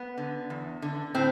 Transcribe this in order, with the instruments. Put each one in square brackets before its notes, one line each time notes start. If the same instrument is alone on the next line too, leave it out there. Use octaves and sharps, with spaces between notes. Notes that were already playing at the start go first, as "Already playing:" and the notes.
Already playing: [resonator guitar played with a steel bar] B3
D3
E2
D3
A2 C4